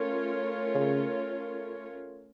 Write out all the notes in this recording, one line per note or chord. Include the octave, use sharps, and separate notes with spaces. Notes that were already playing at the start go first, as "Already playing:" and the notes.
Already playing: A3 C#4 F4 A#4 C#5
C#3